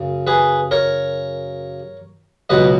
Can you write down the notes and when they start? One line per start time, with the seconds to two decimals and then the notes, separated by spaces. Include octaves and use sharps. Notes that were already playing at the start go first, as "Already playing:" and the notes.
Already playing: F#2 C#3
0.27 G#4 B4
0.71 A#4 C#5
2.50 C#2 B2 F#3 B4 D#5